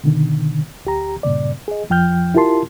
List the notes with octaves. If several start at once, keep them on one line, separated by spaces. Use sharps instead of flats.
B2 D3 D#3
D2 G4 A#5
G2 A#2 C#3 D5
G#4 D#5
F2 F3 G5 F6 G6
E4 F4 G4 A#4 A5 C6